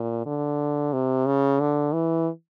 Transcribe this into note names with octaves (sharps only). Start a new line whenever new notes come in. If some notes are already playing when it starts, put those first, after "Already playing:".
Already playing: A#2
D3
C3
C#3
D3
E3